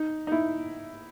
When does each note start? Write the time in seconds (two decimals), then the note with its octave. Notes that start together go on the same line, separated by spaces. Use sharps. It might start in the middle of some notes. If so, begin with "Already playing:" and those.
Already playing: D#4
0.27 D#4
0.32 E4